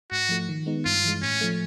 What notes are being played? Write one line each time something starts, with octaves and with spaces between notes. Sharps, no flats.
G#2 F#4
F3 A3
D#3
G#3 B3 D#4
G2 F4
E3 G#3
A2 C#4
F3 A3